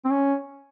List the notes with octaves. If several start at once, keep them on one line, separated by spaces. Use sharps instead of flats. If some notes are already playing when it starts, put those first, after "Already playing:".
C4
C#4